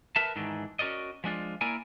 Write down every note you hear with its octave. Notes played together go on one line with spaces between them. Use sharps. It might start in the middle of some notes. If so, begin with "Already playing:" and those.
A#4 B4 E5 A5
G#2 D#3 E3 D4
C#4 F#4 A#4 D5 D#5
F3 G#3 D4 F4
A#3 E4 A#4 D5 G#5